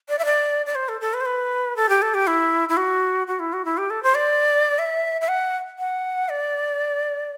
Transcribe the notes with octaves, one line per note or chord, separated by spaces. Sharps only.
D5
E5
D5
D5
C5
A4
A4
B4
C5
B4
A4
G4
A4
G4
E4
E4
F#4
F#4
E4
F#4
E4
G4
A4
C5
D5
E5
E5
F#5
F#5
D5